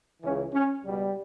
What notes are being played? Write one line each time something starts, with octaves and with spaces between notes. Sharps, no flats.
C#2 C#3 E3 C#4
C#4
C#2 B2 G3